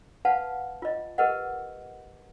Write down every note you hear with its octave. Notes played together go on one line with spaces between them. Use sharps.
B4 F5 F#5 A5
F4 D#5
G4 A#4 B4 D#5 F#5